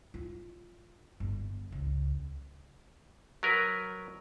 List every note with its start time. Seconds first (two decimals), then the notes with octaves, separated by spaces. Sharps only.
0.14 F4
1.20 G1
1.72 C#2
3.43 F#3 A#4 B4